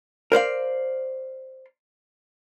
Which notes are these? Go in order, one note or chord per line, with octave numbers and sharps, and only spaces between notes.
A#4 C5 D5 F5